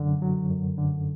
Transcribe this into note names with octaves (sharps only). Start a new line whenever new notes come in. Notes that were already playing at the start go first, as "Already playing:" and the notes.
Already playing: F#2 D3 F#3
F#3
F#2
D3